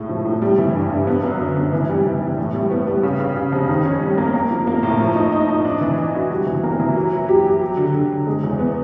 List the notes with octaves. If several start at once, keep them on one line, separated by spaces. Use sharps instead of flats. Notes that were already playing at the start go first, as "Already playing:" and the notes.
Already playing: A2 G#3
F3
A2
G3
E3
G2
G2
B3
F#2
D3
B3
E3
G3
E3
E3
A2
G3
B3
G3
C#3
C#3
C#3
F2
D#3
C#4
G3
A#3
A#3
F3
A#3
A2
F3
D#4
D#4
D#4
D4
E3
D4
F#4
G3
E3
A#3
E3
F#3
F#3
G4
G4
F#3
D3
D3
D3
G#3
E2
B3